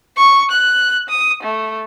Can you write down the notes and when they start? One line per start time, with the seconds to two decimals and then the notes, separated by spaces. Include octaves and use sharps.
0.17 C#6
0.51 F#6
1.09 D#6
1.43 A3